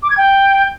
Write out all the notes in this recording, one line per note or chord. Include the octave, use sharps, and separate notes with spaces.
D6
G#6
G5